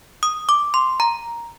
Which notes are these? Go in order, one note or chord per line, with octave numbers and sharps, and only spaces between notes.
D#6
D6
C6
A#5